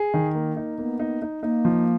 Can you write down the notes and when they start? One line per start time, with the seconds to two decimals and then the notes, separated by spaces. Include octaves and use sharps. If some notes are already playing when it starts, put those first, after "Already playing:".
Already playing: G#4
0.14 D#3
0.35 A#3
0.57 D#4
0.78 A#3 B3
1.00 D#4
1.22 D#4
1.42 A#3 D#4
1.65 F3